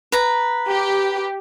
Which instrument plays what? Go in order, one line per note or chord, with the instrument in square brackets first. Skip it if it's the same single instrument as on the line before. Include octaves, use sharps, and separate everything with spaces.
[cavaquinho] B4 A#5
[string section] G4